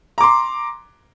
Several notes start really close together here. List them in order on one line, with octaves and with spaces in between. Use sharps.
A#5 D6 C6